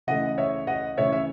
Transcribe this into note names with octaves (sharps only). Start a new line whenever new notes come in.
C#3 E3 A3 D#5 F#5
C#5 E5
D#5 F#5
C#3 E3 A3 C#5 E5
E5